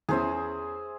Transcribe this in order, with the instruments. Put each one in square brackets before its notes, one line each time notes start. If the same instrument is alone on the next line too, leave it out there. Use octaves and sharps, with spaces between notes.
[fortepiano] E2 E3 C#4 [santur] G#4 C5 E5